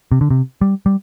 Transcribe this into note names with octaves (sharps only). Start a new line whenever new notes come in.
C3
D3
C3
G3
G3